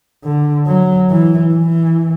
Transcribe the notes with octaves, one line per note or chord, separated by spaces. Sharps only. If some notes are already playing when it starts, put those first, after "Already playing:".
D3
F#3
E3
E3